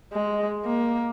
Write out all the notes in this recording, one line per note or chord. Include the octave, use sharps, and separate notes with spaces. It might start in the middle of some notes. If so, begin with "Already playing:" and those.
G#3
A#3